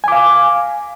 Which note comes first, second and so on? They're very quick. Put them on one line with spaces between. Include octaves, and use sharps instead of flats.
G#5 D6 F5